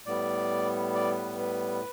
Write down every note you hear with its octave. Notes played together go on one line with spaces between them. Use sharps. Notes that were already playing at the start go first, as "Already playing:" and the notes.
A2 G3 B3 D5
D5
B4
B4